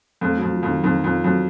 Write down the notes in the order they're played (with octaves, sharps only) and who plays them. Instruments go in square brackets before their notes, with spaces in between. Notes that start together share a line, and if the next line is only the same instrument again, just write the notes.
[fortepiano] F2 [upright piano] A3
[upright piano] F#3
[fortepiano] F2
[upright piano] F3
[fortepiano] F2 [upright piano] D#3
[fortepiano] F2 [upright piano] D#3
[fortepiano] F2 [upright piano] F3
[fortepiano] F2 [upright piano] F#3